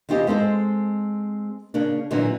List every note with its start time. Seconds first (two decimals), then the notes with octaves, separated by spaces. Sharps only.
0.09 E2 C3 F4 G4 C5 D#5
0.27 G#3 C4 A4 C5
1.74 C#3 A#3 D4
2.11 A#2 D3 E3 F#3 C4